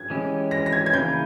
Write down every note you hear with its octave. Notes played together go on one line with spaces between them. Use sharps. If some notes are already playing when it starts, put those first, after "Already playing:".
Already playing: G#6
E3 G#3 C#4 G4
A#6
A#6
G#6
G#6
C#3 E3 A#3 E4 G6